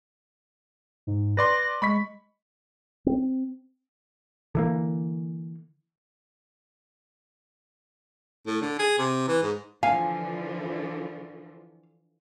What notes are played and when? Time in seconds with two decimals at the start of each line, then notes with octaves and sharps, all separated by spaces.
1.07 G#2
1.37 B4 D5 C6 A#6
1.82 G#3 B5 C#6 B6
3.06 C4
4.55 D3 E3 A#3
8.46 A2
8.62 D3
8.79 G#4
8.98 C3
9.28 E3
9.42 G#2
9.83 D3 E3 F3 F5 G#5